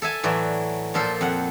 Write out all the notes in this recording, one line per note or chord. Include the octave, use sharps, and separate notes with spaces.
A4 E5 G#5 A5
A2 E3 F#3 D5
A#2 F3 A4 C5
F2 F#5